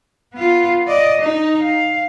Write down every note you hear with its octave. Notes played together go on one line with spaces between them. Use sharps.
B3 F4
D5 D#5
D#4
F5